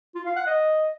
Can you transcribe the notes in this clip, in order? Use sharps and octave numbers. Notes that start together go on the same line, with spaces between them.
F4
F5
F#5
D#5